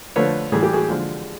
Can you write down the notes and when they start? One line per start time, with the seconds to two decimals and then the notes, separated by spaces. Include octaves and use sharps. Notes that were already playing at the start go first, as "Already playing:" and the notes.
0.16 D3 F3 A3 B4 C#5
0.52 A2 E3 G3 G#4
0.63 G4
0.73 F#4 G#4
0.88 D3 F3 G#3